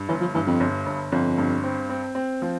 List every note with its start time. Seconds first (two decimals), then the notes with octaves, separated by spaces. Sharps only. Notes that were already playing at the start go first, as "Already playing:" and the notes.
Already playing: G2
0.09 G1 E3
0.21 F3
0.35 G2 E3
0.47 F2
0.60 G1
0.86 G1
1.12 G1 F2
1.38 G2
1.64 C4
1.89 C4
2.15 C4
2.42 F3